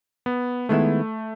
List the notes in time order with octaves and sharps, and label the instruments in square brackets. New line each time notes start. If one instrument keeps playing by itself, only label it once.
[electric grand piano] B3
[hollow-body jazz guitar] D#3 G#3 B3 E4 [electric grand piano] A3